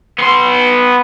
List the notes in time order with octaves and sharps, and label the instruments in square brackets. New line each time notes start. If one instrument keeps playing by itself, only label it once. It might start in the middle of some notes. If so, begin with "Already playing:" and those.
[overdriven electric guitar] B3 C6